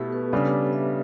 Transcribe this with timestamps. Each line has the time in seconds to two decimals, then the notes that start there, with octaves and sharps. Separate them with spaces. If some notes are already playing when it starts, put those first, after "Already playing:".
Already playing: B2 A3 B3 E4 G4 A4
0.12 B4
0.32 C#3 G3 D4 C#5
0.53 D5
0.73 E5